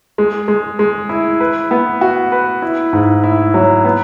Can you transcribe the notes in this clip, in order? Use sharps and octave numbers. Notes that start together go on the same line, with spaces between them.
G#3
G#3
G#3
E4
B4
B3
F#4
B4
E4
G#2
E4
F#3
B3